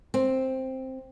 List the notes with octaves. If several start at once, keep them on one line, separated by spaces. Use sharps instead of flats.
C4